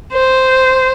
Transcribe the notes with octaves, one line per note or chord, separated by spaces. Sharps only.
C5